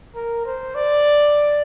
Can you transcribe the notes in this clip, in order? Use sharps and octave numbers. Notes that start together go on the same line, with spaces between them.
A#4
C5
D5